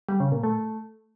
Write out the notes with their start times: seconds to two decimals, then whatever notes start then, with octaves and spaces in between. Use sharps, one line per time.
0.09 G3
0.20 C#3
0.32 A#2
0.43 A3